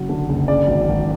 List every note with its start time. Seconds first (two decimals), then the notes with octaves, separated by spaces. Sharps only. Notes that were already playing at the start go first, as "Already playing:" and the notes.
Already playing: F#1 F#3
0.09 D3
0.29 F#1
0.48 C#3 D5
0.68 G#1
0.88 G#1